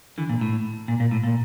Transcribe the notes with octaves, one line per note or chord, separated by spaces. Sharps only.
D3 E3
A#2
A2
A#2
A#2
A2
A#2